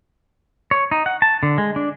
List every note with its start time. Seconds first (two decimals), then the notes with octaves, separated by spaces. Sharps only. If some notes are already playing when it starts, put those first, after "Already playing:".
0.71 C#5
0.91 D#4
1.06 F#5
1.22 A5
1.43 D3
1.58 G#3
1.76 D4